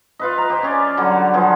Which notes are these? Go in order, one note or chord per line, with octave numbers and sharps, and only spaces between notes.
F4 B4 D#5
A#5
G4 C5
C#4 G#4 D5
D3 F#3 G3
F3 B3 F4 G#4